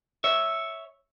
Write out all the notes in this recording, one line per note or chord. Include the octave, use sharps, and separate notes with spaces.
C#5 E5